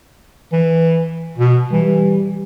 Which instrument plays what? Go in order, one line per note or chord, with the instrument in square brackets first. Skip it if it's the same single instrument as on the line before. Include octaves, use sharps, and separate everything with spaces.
[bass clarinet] E3
B2
[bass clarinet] E3 [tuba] G3